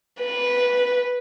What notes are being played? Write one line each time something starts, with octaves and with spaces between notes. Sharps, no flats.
B4